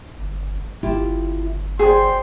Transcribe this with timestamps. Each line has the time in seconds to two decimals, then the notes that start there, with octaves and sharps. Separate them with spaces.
0.18 G1
0.83 G1 E4 F4 G4
1.79 F#4 G#4 C5 D5 G5 C6